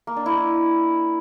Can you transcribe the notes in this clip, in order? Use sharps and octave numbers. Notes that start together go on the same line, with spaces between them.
A#3
D4
E4